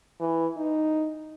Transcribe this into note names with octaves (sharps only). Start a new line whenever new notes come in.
E3
D#4